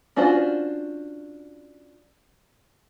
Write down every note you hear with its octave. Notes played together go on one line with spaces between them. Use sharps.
C#4 D4 F4 F#4 C5